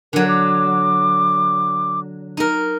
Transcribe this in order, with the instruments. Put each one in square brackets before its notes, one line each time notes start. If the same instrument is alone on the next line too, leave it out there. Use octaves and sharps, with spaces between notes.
[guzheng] D3 F#3 [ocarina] A#4
[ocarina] D6
[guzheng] D#4 A#4